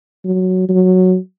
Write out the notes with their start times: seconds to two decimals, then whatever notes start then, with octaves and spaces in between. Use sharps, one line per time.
0.25 F#3
0.69 F#3